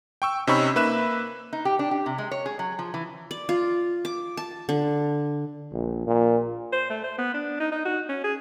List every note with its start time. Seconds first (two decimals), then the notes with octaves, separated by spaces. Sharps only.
0.22 G5 C#6 E6
0.47 C3 C#4 D#4 B5 C#6 E6
0.76 A#3 B4 E5 F#6 E7
1.53 D#4
1.65 G4
1.79 D4
1.91 G4
2.06 C3
2.18 G#3
2.31 C#5
2.46 G#4
2.59 F#3
2.79 F3
2.94 E3
3.31 D5
3.49 F4
4.05 D6
4.37 A5
4.69 D3
5.73 A#1
6.07 A#2
6.72 C5
6.90 A3
7.04 C5
7.18 B3
7.34 D4
7.60 D#4
7.72 D#4
7.85 F#4
8.09 C#4
8.24 G#4